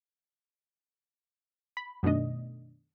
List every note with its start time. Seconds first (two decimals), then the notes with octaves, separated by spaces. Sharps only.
1.77 B5
2.03 F#2 B2 D#3 A3 D4 D#5